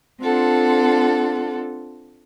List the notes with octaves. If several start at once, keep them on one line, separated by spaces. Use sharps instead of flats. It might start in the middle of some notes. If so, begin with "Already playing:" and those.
C4 D4 F4 A4 F#5